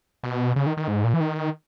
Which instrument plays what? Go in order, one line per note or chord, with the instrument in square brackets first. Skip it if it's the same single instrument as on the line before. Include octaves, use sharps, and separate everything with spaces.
[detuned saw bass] B2
C#3
D#3
D#3
G#2
A#2
E3
D#3